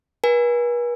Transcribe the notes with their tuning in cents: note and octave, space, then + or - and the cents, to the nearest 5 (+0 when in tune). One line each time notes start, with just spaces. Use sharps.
B4 -45 G#5 -10